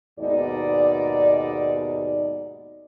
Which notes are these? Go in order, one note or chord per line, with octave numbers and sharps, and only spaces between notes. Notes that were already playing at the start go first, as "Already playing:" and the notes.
D#2 G#2 B2 D#4 D5